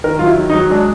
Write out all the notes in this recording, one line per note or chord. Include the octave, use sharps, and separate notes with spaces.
D#3 A#4
F#3 F4
E4
D#3
D#4
F#3
G#3 D4